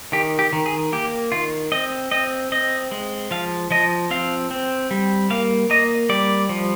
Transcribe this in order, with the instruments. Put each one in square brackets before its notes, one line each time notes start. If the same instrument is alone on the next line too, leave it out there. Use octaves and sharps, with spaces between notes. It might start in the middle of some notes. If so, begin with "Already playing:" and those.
[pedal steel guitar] D#3 G4
G4
D#3
G#4
A#3 G4
D#3 F4
C4 D#5
C4 D#5
C4 D#5
G#3
F3 F5
F3 D#5
C4 F5
C4
G3
A#3 F5
A#3 D#5
G3 D5
F3